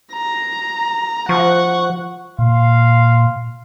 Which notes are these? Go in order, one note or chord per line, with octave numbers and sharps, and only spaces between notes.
A#5
F3 F#5 C#6
A#2 F5 C6